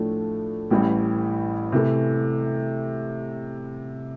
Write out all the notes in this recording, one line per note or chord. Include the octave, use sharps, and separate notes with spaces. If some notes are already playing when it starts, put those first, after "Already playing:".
Already playing: A2 F3 A3 D4
A1 A2 E3 G3
C3 E3 A3